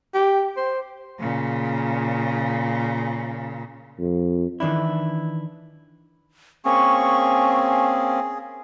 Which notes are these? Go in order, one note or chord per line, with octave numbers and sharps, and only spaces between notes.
G4
C5
A#2 C#3
F2
D#3 E3 D4 E4
A#3 C4 C#4 G#4 C#6